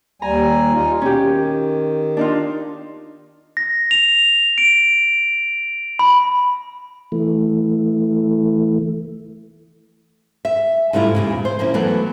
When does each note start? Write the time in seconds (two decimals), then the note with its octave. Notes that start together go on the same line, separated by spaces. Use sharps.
0.22 D#2 G3 G#5 A#5
0.73 D#4 F4
1.02 B2 C#4 G4
1.20 D#3
2.17 D4 D#4 F4
3.57 A#6
3.91 F7
4.58 D7
5.99 B5
7.12 E3 A3
10.45 E5
10.93 G#2 G3 A3 D4 E4 F4
11.15 E2 A#2 C#3
11.45 C5
11.59 F3 A#3 C#4 E4
11.74 E3 F#3 A3 B3